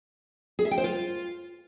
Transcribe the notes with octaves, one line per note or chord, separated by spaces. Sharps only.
G#4
E5
G5
C5
F4